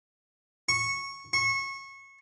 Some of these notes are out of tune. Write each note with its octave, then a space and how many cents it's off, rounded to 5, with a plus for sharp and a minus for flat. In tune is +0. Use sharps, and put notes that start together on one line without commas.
C#6 -10
C#6 -25